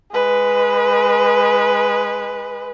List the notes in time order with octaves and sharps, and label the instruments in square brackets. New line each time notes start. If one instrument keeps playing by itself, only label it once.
[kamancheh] G#3 B4